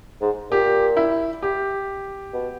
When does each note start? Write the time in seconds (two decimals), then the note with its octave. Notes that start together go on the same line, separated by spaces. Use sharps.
0.21 G#2
0.51 A#2 G4
0.97 E4
1.42 G4
2.33 B2